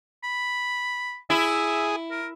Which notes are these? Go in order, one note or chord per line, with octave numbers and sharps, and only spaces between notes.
B5
E4 G#4 E5
A#4